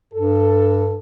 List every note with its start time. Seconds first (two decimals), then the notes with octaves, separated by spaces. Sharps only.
0.14 G2 A4